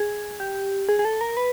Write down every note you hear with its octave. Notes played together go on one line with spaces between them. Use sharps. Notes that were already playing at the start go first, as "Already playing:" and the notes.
Already playing: G#4
G4
G#4
G#4
A4
A#4
B4